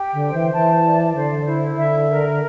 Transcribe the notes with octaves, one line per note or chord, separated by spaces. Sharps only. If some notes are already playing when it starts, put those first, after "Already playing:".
Already playing: G4 G5
D3
C5
E3
E3 A5
D5
D3 C5
E4
D3 E5
A#4